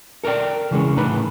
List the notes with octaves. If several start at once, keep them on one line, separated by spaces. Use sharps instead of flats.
A4 A#4 C#5 D5 G5
C#3 E3 G#3 C#4
A2 D#4 B4 B5